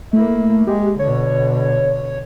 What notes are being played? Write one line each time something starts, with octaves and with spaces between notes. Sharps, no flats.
A3 A#3 E4
G#3 G4
B2 D3 C#5